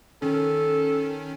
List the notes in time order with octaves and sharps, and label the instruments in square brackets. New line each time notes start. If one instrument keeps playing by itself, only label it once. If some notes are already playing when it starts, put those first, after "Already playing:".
[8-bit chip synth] D#3 C#4 [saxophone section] A4